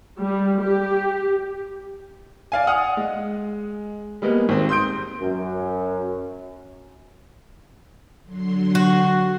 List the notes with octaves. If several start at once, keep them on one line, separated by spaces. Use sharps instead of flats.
G3
G4
D5 F5 G#5
F#5 D#6 F6
G#3
G3 G#3 A#3 B3
G#1 C4
C6 D#6 G6 D7
F#2
D3 F#3 C6
F#4